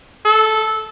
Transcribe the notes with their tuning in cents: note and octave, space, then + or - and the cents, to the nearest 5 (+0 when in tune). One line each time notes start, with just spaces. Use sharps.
A4 -10